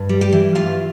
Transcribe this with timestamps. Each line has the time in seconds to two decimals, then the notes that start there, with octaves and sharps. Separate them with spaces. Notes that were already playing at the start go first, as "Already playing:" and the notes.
Already playing: G2
0.09 G3
0.21 G4 G5
0.33 E3
0.55 G2 F4 F5